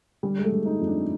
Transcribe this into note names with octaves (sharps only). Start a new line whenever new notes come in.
D3 G3
G#3
A3
D3
D#4
F2
D4